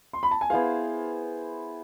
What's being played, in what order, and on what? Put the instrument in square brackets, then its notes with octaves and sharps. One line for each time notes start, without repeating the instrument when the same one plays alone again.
[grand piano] C6
B5
A5
G#5
[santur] B3 E4 G#4 C5 [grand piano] F5